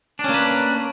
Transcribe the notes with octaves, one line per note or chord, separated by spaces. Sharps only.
A#3 C#4 D4 B4